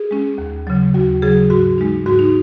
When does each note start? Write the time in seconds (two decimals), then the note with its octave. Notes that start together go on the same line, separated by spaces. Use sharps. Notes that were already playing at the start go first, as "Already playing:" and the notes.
Already playing: G#4
0.11 G#3 C#4
0.38 D#2
0.67 C#3 F#3
0.94 D#2 F#4
1.22 C#3 F#3 G#4
1.50 G#2 F#4
1.78 G#3 D#4
2.06 G#2 F#4
2.19 D#4